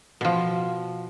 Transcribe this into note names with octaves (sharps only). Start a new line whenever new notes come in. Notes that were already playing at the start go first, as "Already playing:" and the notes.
B2 F3